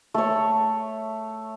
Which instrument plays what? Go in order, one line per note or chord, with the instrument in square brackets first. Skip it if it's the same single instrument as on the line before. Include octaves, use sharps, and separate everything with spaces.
[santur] A3 C#5